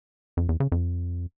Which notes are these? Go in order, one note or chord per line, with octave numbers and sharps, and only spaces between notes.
F2
E2
C#3
F2